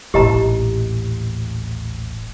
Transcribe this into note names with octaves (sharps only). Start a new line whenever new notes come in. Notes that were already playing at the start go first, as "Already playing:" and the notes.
D#1 A1 G4 D#5 A#5